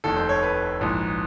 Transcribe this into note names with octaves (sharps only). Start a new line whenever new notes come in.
F1 D#2 D#3 A4
C5
C#5
B4
A#1 G#2 E3